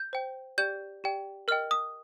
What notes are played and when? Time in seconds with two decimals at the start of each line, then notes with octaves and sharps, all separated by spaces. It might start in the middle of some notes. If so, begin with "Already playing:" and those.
Already playing: G6
0.13 C5 G5
0.58 G4 D5 G5 G6
1.04 G4 D5 G5
1.48 A#4 D#5 G5 F6
1.71 D#6